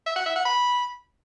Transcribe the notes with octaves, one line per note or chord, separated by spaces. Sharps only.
E5
F#5
E5
F#5
B5